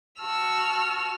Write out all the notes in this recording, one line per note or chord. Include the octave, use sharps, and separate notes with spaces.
F#4 A5 E6 F6